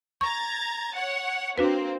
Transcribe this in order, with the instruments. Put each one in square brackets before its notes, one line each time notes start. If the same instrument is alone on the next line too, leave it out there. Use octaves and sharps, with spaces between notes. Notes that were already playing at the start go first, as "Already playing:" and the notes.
[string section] A#5 G#6 A6 [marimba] C#6
[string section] C#5 F#5
[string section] A#3 C4 [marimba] D4 F#4 B4